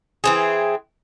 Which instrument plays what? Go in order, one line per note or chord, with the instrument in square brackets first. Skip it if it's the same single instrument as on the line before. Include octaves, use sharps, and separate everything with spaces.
[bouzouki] E3 C4 G#4